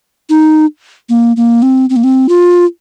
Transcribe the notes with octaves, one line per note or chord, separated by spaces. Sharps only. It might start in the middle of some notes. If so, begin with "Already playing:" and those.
D#4
A#3
A#3
C4
C4
A#3
C4
F4